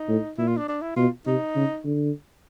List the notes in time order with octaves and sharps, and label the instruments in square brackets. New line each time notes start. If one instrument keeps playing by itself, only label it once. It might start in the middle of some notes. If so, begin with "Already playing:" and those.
Already playing: [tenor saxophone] D#4
[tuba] A2
[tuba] A#2 [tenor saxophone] E4
[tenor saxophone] F4
D4
D4
E4
[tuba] B2 [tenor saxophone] F4
[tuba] C3 [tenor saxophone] D#4
[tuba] C#3
D3